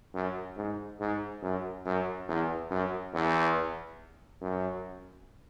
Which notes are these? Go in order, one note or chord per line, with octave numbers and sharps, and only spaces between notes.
F#2
G#2
G#2
F#2
F#2
E2
F#2
E2
F#2